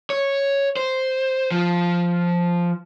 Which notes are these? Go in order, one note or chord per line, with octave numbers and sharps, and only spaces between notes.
C#5
C5
F3